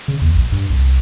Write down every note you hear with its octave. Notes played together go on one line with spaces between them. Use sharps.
C#3
D#2
A#1
G2
C2